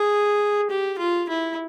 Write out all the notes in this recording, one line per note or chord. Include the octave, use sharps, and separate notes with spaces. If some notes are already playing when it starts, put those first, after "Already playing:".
Already playing: G#4
G4
F4
E4